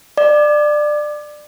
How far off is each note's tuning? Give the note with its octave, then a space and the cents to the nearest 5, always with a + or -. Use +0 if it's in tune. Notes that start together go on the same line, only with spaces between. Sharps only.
D5 +20